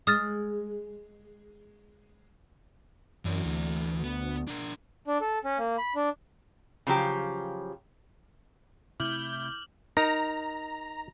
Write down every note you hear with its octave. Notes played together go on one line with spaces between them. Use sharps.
G#3 D#6 F6 A6
F#2 E3 D5
D2
B3
D4 A#4
D4
A4
C#4
A#3
B5
D4
C#3 F3 F#3 G4
C3 A3 E4 D6 F6 G6 F#7
D#4 A#4 A#5